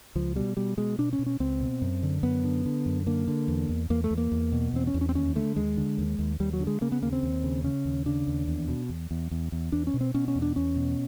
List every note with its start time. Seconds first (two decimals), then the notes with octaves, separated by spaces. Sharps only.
0.15 C#2 F3
0.36 B2 G3
0.57 B2 G3
0.77 B2 G#3
0.98 B2 D4
1.13 C#4
1.19 B2
1.26 C#4
1.40 C#2 C4
1.61 B2
1.82 F#2
2.03 D3
2.23 F#2 B3
2.44 D3
2.65 D3
2.86 F#2
3.06 D3 A#3
3.28 D3
3.48 E2
3.69 E2
3.90 E2 A#3
4.04 A3
4.11 E2
4.18 A#3
4.32 E2
4.52 B2
4.73 E2 C4
4.87 C#4
4.94 E2
5.01 C#4
5.09 C4
5.15 D#2 C#4
5.35 D3 A3
5.56 D#2 G#3
5.77 D3
5.98 D#2
6.19 D#2
6.40 D#2 G3
6.53 F#3
6.60 D3
6.67 G#3
6.81 C#3 A#3
6.92 B3
7.02 D#2 A#3
7.13 C4
7.23 D#2
7.44 C#3
7.64 C#3 C#4
7.85 D#2
8.06 C#3 D4
8.27 D#2
8.48 E2
8.68 B2
8.89 E2
9.11 E2
9.31 E2
9.52 E2
9.72 E2 D4
9.87 C#4
9.94 B2
10.01 C4
10.14 B2 C#4
10.28 C#4
10.35 E2
10.42 D4
10.56 E2 C#4
10.76 B2